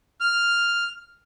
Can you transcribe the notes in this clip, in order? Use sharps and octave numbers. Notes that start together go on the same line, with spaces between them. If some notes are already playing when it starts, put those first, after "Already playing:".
F6